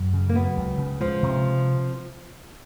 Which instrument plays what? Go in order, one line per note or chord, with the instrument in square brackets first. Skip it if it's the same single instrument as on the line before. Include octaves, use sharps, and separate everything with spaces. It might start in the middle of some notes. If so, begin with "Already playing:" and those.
Already playing: [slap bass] F#2
C#3
[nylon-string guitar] A#3
[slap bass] F#3 [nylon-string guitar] B3
[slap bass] C#2
C#3
[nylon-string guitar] F3 [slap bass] G#3
[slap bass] C3